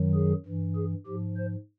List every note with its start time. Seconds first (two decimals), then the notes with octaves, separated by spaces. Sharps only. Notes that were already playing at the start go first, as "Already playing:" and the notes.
Already playing: F#2 D#3 F#3
0.15 G#4
0.46 G2 E3
0.76 G#4
1.07 G#2 F3 G4
1.37 C5